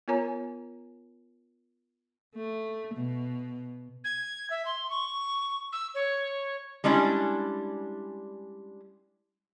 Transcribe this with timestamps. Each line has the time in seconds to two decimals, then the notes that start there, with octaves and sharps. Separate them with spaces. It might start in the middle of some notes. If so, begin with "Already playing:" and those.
0.08 B3 F4 A#4 C#5 G#5 A#5
2.35 A3
2.95 B2
4.04 G#6
4.50 E5
4.66 C6
4.90 C#6
5.73 E6
5.95 C#5
6.84 G3 G#3 C#4 D4 E4